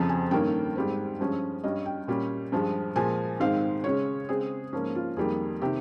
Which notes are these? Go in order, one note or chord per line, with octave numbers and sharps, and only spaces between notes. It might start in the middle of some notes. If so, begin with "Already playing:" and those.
Already playing: F2 C#3 F3 C4 A#5
G#5
G2 D#3 A#3 C#4 G5
G#2 G3 C4
G2 F3 G#3 C#4
G2 G3 C#4 D#5
G5
A#2 G3 C#4
G2 F3 G#3
A#2 F3 G#3 G#5
G#2 D#3 G#3 C4 F5
C#3 G#3 C#4 C#5
C#3 G#3 C4 G#4
G#2 F3 A#3 C#4
F4
F2 D#3 G3 A#3 G#4
C3 D#3 G4